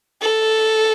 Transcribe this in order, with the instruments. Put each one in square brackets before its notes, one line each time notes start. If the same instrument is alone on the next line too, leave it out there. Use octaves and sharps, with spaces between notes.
[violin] A4